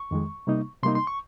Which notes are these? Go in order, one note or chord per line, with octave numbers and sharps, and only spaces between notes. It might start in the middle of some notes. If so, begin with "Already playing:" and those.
Already playing: C#6
F2 D#3 G#3
C3 G3 A#3 D#4
C3 G3 A#3 D#4 C6
C6
C#6